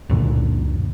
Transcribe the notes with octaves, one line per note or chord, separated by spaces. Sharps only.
C#2 F#2 A#2 D3